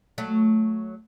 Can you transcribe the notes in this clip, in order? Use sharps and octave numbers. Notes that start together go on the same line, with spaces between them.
F#3 A3